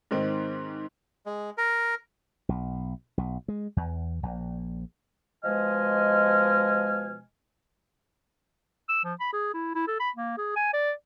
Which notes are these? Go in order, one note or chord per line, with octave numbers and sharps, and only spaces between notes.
G#2 D#3 C4
G#3
A#4
B1
B1
G#3
E2
A#1
B2 F3 G#3 D#5 G#5 F6
E6
F3
B5
G#4
E4
E4
A4
B5
A#3
G#4
G#5
D5